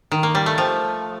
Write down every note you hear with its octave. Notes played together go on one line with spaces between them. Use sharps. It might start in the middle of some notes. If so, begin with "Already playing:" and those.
D#3
A#3
G3
A3
F3